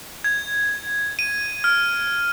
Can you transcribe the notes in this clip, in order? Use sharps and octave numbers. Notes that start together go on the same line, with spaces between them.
G#6
D#7
F6